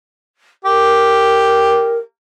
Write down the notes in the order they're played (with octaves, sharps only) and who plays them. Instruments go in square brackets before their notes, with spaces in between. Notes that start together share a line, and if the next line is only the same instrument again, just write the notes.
[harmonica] G4 [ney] A#4